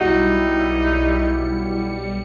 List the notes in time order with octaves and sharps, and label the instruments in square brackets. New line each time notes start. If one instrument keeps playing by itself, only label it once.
[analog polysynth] B1 G3 C#7 [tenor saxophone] D#4 [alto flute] E4 [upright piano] F#4